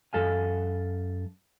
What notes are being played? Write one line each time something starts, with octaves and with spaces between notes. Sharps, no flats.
F#2 A4 F5 G#5